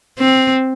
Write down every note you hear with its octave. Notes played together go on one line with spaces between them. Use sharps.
C4